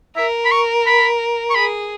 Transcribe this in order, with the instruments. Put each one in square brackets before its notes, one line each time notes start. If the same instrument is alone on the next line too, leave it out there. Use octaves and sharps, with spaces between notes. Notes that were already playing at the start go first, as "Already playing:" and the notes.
[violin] A#4 [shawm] E5
[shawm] B5
C#6
B5
C#6
[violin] G#4 [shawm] B5